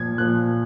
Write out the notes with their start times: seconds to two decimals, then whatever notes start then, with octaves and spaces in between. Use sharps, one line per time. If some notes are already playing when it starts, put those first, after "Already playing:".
Already playing: A#2 F3 G#6
0.18 A#2 F3 F#6